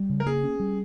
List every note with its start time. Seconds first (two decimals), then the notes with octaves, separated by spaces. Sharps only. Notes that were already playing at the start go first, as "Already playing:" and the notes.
Already playing: G3
0.10 C#3
0.20 A#4
0.26 A#3 G#4
0.44 C#4
0.60 G3